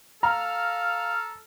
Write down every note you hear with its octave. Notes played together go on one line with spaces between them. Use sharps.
A4 F5 A#5 F6